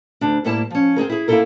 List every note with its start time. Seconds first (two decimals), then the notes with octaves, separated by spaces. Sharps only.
0.21 D2 D4
0.45 A2 G3 A#3 E4 C5 A5
0.71 F3 C#4
0.96 C4 D#4 G#4 A#4
1.10 E4 G#4
1.28 A#3 C4 E4 F4 A4 A#4